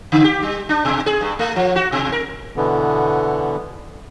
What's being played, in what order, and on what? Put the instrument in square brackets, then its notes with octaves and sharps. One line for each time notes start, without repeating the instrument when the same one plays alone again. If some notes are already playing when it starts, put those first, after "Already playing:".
[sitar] C#3
G4
G3
D4
B2
G#4
G2
A3
F3
F#4
B2
A#4
[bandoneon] B2 D3 E3 B3